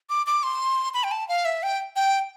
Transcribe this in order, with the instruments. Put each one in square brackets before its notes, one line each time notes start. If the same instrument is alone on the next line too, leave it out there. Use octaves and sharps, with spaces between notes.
[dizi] D6
D6
C6
B5
G5
A5
F5
E5
G5
G5